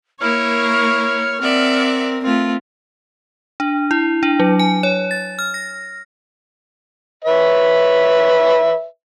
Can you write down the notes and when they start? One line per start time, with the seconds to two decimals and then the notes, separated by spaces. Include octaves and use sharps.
0.21 A#3 E4 A#4 C#5 C#6 F6
1.41 C4 A#4 D5 E5 F#5
2.23 A3 C4 F4
3.60 D4
3.91 E4
4.23 D4
4.40 F#3
4.59 G#5
4.83 C#5
5.11 A6
5.39 F6
5.54 A#6
7.24 B4 C#5 E5